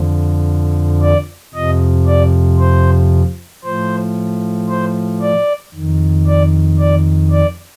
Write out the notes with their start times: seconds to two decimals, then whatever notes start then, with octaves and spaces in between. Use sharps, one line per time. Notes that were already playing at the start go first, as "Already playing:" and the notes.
Already playing: F2 D3 F3
1.02 D5
1.54 F2 C3 F3 D#5
2.07 D5
2.59 C5
3.64 A2 F3 C5
4.69 C5
5.22 D5
5.74 F2 D#3
6.27 D5
6.79 D5
7.31 D5